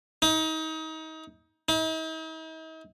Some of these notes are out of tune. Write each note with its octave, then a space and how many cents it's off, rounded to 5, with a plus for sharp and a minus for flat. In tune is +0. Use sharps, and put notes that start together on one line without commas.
D#4 +30
D#4 +45